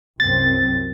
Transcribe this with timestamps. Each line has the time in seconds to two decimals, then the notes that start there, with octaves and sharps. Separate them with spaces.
0.20 C2 F#2 C4 A6